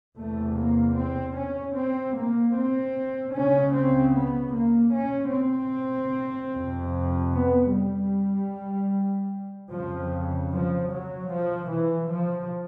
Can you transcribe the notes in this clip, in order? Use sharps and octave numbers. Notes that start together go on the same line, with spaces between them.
E2 C3 A3
A#3
C4
C#4
C4
A#3
C4
C#2 C#3 C#4
C4
B3
A#3
C#4
C4
F2 C3
B3
G3
F2 C#3 F3
F3
F#3
F3
E3
F3